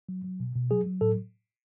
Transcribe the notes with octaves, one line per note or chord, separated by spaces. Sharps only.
F#3
F#3
B2
B2
F#3 G#4
F#3
A2 A4